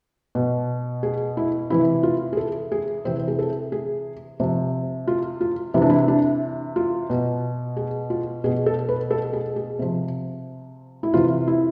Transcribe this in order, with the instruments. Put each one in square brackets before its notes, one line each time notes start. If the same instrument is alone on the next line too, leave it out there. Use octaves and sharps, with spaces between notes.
[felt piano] B2
G#4
E4
C3 E3 E4
F4
G#4
A4
G#4
C3 E3 C4
G#4
A4
G#4
C3 F3
F4
F4
C3 E3 E4
D4
E4
D4
F4
B2
G#4
F4
B2 G#4
A4
B4
A4
G#4
G#4
C3 F3
E4
C3 E3 F4
E4